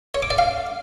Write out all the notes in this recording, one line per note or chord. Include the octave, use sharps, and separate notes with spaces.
C#5
D6
D5
F5